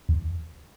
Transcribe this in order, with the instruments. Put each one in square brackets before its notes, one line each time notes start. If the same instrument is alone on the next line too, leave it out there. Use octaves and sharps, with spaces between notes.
[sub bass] E2